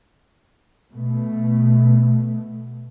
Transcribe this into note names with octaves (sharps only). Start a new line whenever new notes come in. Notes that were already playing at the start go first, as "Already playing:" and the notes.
B2 A3